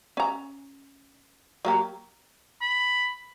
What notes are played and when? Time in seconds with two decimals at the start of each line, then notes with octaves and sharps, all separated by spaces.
0.17 C#4 A#5
1.65 F#3 A#3 G4
2.61 B5